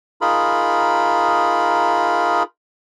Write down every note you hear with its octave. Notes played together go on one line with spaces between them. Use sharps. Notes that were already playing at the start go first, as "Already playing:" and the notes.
D#4 F4 G#4 A#4 B5